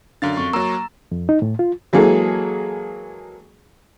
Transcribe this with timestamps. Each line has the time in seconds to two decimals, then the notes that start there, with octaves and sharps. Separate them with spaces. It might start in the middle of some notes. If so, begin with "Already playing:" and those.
0.22 F#2 D3 F5 A6
0.37 F2 C#6
0.53 F#3 A#3 A#5 E6
1.12 F2
1.29 D#4
1.42 A2
1.59 F4
1.93 E3 F#3 G#3 A#3 G#4 A4